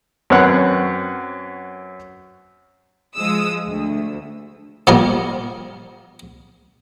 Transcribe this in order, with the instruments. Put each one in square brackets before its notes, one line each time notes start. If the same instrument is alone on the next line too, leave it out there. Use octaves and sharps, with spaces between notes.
[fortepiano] F#2 C4 B4 C#5 F#5 F#6
[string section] F3 G#3 D#6 E6
D2
[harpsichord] A#2 F3 G3 B3 D#4 A#4